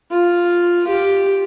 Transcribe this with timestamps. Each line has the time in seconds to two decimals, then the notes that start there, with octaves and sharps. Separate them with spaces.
0.11 F4
0.88 G4